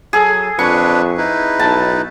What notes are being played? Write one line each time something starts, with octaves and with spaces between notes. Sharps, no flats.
F#3 G#4 A4
F2 D4 B4 C#6
D#4 E4 B4
B1 A5